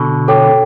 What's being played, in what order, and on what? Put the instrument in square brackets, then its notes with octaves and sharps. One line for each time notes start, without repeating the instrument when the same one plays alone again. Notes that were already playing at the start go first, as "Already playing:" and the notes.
Already playing: [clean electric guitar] B2 D3
[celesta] A4 C#5 G5 D6